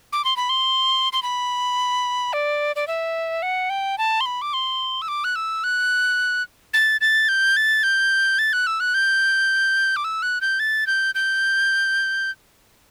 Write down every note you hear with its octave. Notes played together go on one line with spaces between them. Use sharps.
D6
C6
B5
C6
C6
B5
D5
D5
E5
F#5
G5
A5
C6
B5
D6
C6
E6
D6
F#6
E6
F#6
A6
A6
G6
A6
G6
A6
F#6
E6
F#6
G6
D6
E6
F#6
G6
A6
G6
G6